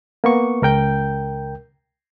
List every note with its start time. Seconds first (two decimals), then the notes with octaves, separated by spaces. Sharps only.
0.24 A#3 B3 C#6
0.62 C#2 A#4 G5 G6